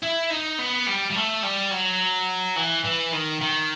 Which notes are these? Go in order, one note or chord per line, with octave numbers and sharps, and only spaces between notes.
E4
D#4
B3
G3
G3
A3
G3
F#3
E3
E3
D#3
D#3